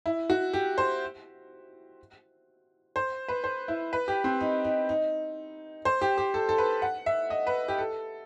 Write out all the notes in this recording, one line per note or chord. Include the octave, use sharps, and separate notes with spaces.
E4
F#4
G4
C5
C5
B4
C5
E4
B4
G4
C4
D#4
D#4
D#4
C5
G4
G4
A4
A4
B4
F#5
E5
D#5
B4
G4
A4